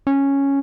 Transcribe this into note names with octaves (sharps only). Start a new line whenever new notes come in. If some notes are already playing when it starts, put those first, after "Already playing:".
C#4